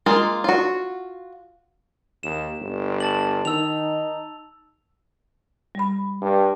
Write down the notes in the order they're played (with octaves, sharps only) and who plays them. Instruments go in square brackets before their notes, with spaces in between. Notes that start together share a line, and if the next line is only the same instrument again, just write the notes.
[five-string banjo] G#3 A#3 F4
F4 F#4
[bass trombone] D#2 [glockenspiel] E7
[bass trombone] G1
[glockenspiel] A5 A6 F#7
[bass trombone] D#3 [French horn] D#4 [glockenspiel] E6 F7
[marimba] G3 B5
[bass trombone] G2